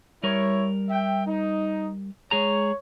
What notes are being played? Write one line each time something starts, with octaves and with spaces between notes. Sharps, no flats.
G3 E4 A#4 C#5
E5 G5
D#4
G#3 G#4 C#5 A#5